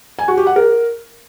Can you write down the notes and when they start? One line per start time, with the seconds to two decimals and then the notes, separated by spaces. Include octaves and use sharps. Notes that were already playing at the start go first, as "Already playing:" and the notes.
0.19 G#5
0.28 F#4
0.37 G4
0.47 F#5
0.56 A#4